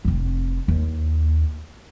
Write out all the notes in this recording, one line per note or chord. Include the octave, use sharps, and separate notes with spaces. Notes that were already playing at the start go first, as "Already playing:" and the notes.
F1 C4
D#2